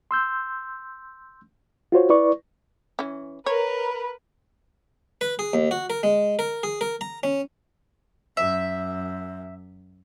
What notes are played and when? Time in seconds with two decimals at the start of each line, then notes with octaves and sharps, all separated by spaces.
0.11 C6 E6 G6
1.92 F4 F#4 C5 C#5
2.09 E4 B4 D5 C#6
2.99 E3 C#4
3.46 A#4 B4 C#5
5.21 B4
5.39 G#4
5.53 D#2
5.71 F#4
5.90 A#4
6.03 G#3
6.39 A#4
6.63 G#4
6.81 A#4
7.01 A#5
7.23 C#4
8.37 F#2 E5